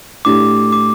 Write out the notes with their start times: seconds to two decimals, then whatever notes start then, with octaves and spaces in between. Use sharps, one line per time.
0.25 A2 A3 D4 G4 D6
0.72 D6